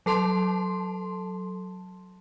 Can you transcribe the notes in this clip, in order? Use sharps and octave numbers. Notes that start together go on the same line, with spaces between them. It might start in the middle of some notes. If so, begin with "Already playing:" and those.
F#3 A4 A5 C6